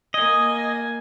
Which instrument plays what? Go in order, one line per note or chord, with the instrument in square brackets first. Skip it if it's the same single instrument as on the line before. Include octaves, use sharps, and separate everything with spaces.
[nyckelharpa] A#3 G#5 [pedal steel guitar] D#5